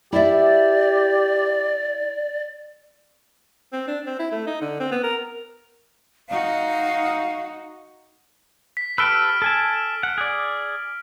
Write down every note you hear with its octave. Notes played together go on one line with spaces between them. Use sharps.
E4 G4 D5 E5
C4
D4
C4
E4
A3
D#4
D3
C4
B3
A#4
D#4 F#4 F5
B6
G4 A4 B4 E6 F6 D7
A4 G#5 A5
F#5
G#4 D5